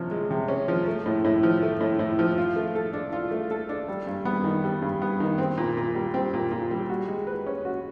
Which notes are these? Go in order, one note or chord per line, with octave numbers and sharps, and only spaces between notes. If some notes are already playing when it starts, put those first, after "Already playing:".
Already playing: C3 F3 C#4
G#3
C3
C#4
F3
A3
A2
A2
F3
A3
A2
A2
F3
F4
A3
A4
D4
F4
A3
A4
D4
G3
G2
B3
D#3
G3
G2
B3
D#3
C4
A#2
A#2
G3
C4
A#2
A#2
G3
F#4
G#3
B4
C#4
F#4